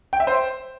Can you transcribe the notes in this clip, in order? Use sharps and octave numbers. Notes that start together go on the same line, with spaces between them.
G5
E5
C5